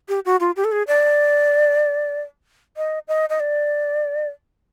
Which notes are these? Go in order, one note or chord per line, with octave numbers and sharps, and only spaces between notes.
G4
F#4
F4
G4
A4
G#4
D5
D#5
D#5
D#5
D5